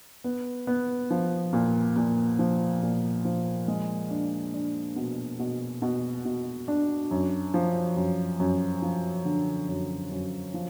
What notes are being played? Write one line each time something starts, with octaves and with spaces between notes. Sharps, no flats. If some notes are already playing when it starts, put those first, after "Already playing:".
B3
B3
F3
A#2
A#2
F3
A#2
F3
G#3
D4
D4
B2
B2
B2
B2
D4
F#2
F3
F#2
F#2
F3
D3
F#2
F#2
F3